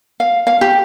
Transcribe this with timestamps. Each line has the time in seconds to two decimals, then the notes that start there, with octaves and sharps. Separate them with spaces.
0.20 F5
0.47 F5
0.61 G4